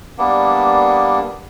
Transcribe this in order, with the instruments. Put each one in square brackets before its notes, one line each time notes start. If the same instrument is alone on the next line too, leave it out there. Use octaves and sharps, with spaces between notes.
[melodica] G3 A#3 B3 D4